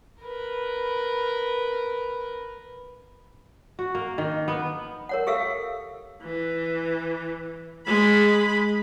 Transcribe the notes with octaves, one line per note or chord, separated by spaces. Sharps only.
A#4 B4
F#4
A#3
D#3
B3
A#4 C#5 F#5
G4 A4 E5 F5 E6
E3
G#3 B5